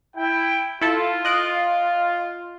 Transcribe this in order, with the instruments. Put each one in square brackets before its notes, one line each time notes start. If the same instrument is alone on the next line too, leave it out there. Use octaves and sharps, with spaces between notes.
[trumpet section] E4 G5
[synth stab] E4 A4 [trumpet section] F4
[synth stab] D#5 F#6 D7